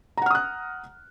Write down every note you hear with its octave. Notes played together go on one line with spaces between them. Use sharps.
F#5 A#5 D#6 F6 F#6